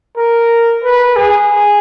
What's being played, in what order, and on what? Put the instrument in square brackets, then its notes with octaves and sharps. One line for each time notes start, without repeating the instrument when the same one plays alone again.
[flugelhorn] A#4
B4
G#4